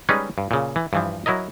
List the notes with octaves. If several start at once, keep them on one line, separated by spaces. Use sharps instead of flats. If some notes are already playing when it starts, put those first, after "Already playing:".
G3 G#3 C#4 D#4 B4
G2
A#2 C#3
E3
G2 E3 F3
F#3 E4 A#4 D#5